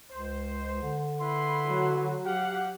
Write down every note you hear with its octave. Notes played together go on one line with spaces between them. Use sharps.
C#2 C5
D3
E4 B4 C6
F#3
F#3 G4 F5 F#5